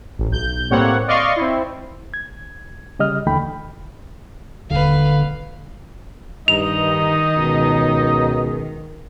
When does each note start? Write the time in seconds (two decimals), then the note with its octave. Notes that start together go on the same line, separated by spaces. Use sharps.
0.18 A1
0.30 B1 G6
0.70 A2 G3 A#3 C4 C#5 F#5
1.07 D5 D#5 F5 C6 C#6
1.36 C4 E4
2.14 G#6
2.99 C#3 G3 D#5 F6
3.27 D#2 D3 E3 A3 G5 B5
4.71 D#1 D3 B4 F5
6.48 G2 D#3 D#4 D#5 F7
7.35 C#2 B2